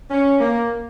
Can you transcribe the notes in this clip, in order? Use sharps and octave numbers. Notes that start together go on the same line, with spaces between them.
C#4
A#3